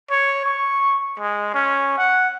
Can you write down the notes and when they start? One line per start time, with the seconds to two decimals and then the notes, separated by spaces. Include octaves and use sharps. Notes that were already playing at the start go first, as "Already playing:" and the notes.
0.10 C#5
0.46 C#6
1.20 G#3
1.54 C#4
1.97 F#5